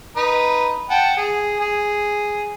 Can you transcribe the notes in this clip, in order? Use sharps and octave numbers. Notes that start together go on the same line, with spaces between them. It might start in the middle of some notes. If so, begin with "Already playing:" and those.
D#4 B4
F#5 G5 A5
G#4
G#4